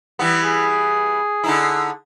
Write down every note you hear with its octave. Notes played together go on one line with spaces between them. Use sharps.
E3 G3 B3
G#4
D3 D#4 E4